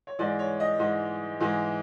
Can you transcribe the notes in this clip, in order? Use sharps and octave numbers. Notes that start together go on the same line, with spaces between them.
C#5
G#2 E3 G#3 D5
C#5
D#5
G#2 E3 G#3
G#2 E3 G#3